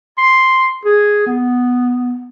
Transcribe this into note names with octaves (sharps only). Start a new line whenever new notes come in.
C6
G#4
B3